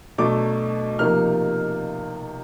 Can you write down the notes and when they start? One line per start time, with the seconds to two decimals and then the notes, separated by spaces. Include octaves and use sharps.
0.18 B2 F#3 A3 D4 D6
0.99 C3 F3 A#3 D#4 F6